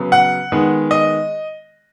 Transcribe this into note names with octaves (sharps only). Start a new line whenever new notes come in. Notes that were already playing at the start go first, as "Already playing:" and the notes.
Already playing: C#3 F#3 B3
F#5
D#3 G#3 B3
D#5